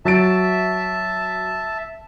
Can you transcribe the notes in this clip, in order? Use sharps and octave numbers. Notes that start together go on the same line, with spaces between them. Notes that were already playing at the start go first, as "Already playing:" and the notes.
F#3 E5 A5 A6 D7